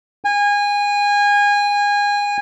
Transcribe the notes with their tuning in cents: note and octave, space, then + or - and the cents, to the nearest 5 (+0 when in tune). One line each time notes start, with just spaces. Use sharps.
G#5 -25